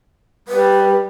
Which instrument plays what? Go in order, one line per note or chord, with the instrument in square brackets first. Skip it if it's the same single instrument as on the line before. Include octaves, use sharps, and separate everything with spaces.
[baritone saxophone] G3 [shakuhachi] B4